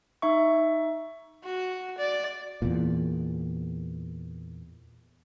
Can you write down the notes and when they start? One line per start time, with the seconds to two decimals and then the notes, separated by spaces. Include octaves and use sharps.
0.22 D#4 E5 C#6
1.44 F#4
1.98 D5
2.62 E2 A#2